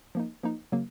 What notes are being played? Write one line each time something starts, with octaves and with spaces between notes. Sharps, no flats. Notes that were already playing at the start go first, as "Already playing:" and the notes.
F3 A#3 D#4
F3 A#3 D#4
C#3 F#3 A#3